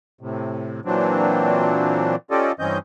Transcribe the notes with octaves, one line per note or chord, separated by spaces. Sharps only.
A2 C3
A#2 E3 F#3 C4 D4
C#4 F4 G4 A4 D5 D#5
G2 E3 C4 C#4 D#5 G6